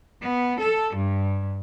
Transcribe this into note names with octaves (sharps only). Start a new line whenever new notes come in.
B3
A4
G2